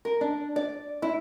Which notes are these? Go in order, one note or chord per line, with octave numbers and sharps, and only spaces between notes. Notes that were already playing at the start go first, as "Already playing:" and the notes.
A#4
D4
D5
E4